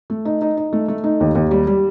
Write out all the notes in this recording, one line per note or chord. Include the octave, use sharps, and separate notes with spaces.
A3
D#4
D#4
D#4
A3
A3
D#4
D#2
D#2
G3
G3